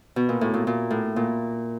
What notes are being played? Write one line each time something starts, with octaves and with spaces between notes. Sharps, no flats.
B2
A#2
A2
A#2
A#2
A2
A#2